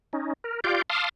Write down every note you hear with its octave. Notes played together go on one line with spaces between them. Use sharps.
C#4 D#4
A#4
F4 G4 D5 F5 G6
F5 A5 C6 D6 D#6 F6